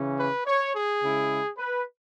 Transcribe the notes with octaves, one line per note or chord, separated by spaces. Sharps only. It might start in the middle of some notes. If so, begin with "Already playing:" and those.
Already playing: C#3 E3 C#4
B4
C#5
G#4
C#3 G#3 E4
B4